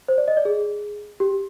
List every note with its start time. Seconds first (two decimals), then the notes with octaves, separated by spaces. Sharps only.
0.08 C5
0.18 D5
0.28 D#5
0.37 D5
0.45 G#4
1.20 G4